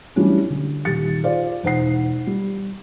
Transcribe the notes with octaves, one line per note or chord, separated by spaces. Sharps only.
E3 F#3 G3 A3 C#4 D4
D3
D#1 G4 A6 C#7
F4 G#4 C5 D5 F5
E1 D#4 C5 F#5 C7
G3